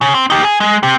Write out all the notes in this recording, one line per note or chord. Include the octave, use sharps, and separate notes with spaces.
C#3
C4
D#4 G4
G#4 G#5
G#3
C4 G4